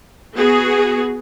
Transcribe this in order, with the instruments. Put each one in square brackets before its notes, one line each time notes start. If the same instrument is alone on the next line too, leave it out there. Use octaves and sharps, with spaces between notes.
[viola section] B3 F#4 G#4